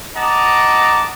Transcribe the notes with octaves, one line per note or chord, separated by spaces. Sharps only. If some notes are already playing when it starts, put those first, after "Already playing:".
D#5 F#5 A5 A#5 D6